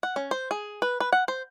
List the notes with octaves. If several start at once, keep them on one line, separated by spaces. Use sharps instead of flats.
F#5
C#4
C5
G#4
B4
B4
F#5
C5